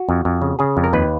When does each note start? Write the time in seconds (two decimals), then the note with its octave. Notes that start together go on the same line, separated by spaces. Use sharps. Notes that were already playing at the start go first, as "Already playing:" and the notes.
Already playing: F#4
0.09 F2
0.25 F2
0.42 C#3
0.59 C#3 G#4
0.77 F2
0.84 A#4
0.93 D#2 B4